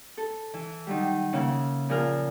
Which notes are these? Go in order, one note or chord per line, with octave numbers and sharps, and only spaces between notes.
A4
E3
D#3 F#3 G3
C#3 A#3 E4
A#2 F3 G#4 A#4 F6